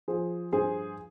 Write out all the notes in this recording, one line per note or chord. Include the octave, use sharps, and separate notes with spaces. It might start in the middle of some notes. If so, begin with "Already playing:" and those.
F3 G#4 C5
G2 G#4 C5